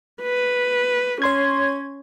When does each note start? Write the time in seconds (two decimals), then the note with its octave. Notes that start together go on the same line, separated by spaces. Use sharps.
0.23 B4
1.22 C#4 C#5 C6 G#6